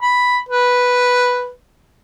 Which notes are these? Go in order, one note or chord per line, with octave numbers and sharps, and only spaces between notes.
B5
B4